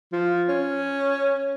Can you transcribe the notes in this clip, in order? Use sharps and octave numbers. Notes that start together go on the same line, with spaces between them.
F3
C#4